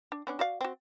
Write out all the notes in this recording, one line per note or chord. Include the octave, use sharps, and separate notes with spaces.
D4
B3 C#4 D4
F#4 D5 F5
C4 F#4